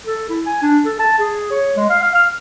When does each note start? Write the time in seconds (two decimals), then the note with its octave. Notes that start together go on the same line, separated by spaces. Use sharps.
0.06 A4
0.29 E4
0.46 G#5
0.62 D4
0.86 A4
0.99 A5
1.19 G#4
1.51 C#5
1.77 G#3
1.90 F5
2.02 F5
2.15 F6